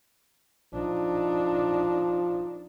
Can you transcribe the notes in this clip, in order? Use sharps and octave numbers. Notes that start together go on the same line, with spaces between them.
F3 D4 D#4